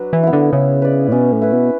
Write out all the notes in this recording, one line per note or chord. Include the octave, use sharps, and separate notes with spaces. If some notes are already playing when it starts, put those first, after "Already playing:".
Already playing: F#3 D4 B4
E3
B3 E4
D3
C#3 E4
B4 D5
A2
B2 C#4
A2
E4 B4
B2